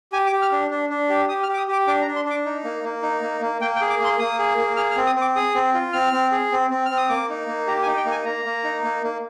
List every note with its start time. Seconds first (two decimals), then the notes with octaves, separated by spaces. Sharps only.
0.12 G4 G#5
0.27 D6
0.32 G4
0.42 F6
0.52 D4
0.70 D4
0.89 D4
1.09 G4
1.29 G4 D#6
1.43 F6
1.48 G4
1.54 D6
1.58 D#6
1.68 G4 D6
1.87 D4 D6
2.02 A#5
2.07 D4
2.16 C6
2.25 D4
2.30 D6
2.46 D#4
2.64 A#3
2.84 A#3
3.02 D#4
3.22 A#3
3.41 A#3
3.61 A#3 G5
3.76 G5
3.81 G#4
3.90 D6
4.00 A#3 C6
4.19 A#3 D#6
4.39 G#4
4.58 A#3
4.77 G#4 F6
4.91 F6
4.96 C4
5.07 D#6
5.15 C4
5.21 D6
5.36 G#4 D#6
5.55 C4
5.75 F4
5.93 C4 F6
6.13 C4
6.32 G#4
6.52 C4
6.70 C4
6.86 C4 F6
6.97 D#6
7.09 A#3 D6
7.29 D#4
7.48 A#3
7.67 G4 A#5
7.82 G#5
7.87 D#4
7.97 G5
8.06 A#3
8.11 G#5
8.25 A#3 A#5
8.45 A#3
8.64 D#4
8.84 A#3
9.03 A#3